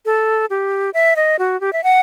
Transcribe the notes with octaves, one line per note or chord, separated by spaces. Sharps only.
A4
G4
E5
D#5
F#4
G4
E5
F#5